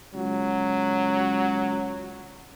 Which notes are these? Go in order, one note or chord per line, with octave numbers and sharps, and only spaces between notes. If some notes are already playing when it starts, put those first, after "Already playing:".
C#2 F#3